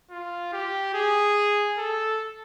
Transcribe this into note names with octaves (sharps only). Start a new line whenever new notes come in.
F4
G4
G#4
A4